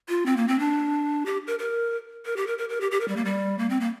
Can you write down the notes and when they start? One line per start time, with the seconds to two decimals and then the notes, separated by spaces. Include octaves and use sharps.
0.09 F4
0.26 C4
0.37 A#3
0.48 C4
0.59 D4
1.26 G4
1.47 A#4
1.59 A#4
2.26 A#4
2.37 G4
2.47 A#4
2.58 A#4
2.69 A#4
2.81 G4
2.91 G4
3.00 A#4
3.08 G3
3.16 A#3
3.25 G3
3.59 A#3
3.70 C4
3.80 A#3